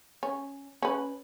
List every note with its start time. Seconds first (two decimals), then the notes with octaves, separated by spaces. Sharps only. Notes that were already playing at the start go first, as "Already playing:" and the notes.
0.23 C#4
0.82 C#4 B4